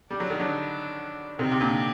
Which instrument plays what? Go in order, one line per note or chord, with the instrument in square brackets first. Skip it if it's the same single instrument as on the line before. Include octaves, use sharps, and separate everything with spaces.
[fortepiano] G3 [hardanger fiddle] D4
[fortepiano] F#3
D#3
D3 F#3
[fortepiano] C3 D#3 [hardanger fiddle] C4
[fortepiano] C3
A#2 D3